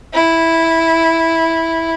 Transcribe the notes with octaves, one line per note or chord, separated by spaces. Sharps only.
E4